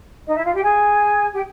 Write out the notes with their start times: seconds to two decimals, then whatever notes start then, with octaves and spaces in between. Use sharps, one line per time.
0.27 D#4 D#5
0.35 E4 E5
0.44 F4 F5
0.53 G4 G5
0.62 G#4 G#5
1.33 G4 G5